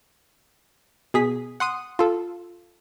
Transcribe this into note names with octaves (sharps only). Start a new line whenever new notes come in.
B2 G#4 B6
F#5 C6 D#6
F4 A4